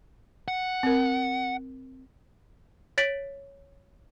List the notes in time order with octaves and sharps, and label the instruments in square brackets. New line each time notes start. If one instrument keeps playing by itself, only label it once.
[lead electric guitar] F#5
[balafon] C4 A#4
[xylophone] C#5 A6 B6 D7 F#7